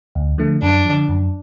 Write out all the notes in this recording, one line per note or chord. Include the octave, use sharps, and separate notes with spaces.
D2
D3 F3 A3
F#2 D4
D3 F3
F#2